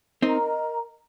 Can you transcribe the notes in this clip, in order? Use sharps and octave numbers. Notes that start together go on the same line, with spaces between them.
C4 D#4 A#4 D#5 A#5